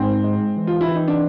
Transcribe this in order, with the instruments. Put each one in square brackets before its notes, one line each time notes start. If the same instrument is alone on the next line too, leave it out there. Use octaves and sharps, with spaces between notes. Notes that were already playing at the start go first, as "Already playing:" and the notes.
Already playing: [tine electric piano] G#2 [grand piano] C4
[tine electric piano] G#3
E3
[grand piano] F4
E4
[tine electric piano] E3
[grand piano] D#4
D4